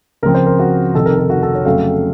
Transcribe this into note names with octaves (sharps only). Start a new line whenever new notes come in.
C#2 C#3 F3 C4 A#4
C5
A#4
F#4
F1 F2 C3 D#3 A4
A#4
A4
F#4
A4
C#5
F2 C#3 F#3 A3 C4 F5